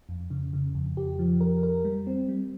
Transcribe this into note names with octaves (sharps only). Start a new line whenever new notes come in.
F2
C#3
C#3
F2
G4
F3
A#4
A#4
G3
C4
G3